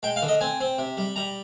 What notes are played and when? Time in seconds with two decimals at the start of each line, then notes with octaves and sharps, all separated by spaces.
0.03 G#3 G5
0.16 F5
0.22 D3
0.28 D#5
0.41 C4 G#5
0.60 C4
0.78 C3
0.97 G3
1.16 G3 A#5